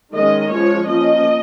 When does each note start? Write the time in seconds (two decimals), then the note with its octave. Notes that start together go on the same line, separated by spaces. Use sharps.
0.13 D#3 G#3 C#4 D#5
0.50 F3 G#3 C#4 C#5
0.87 F3 A#3 C#4 D#5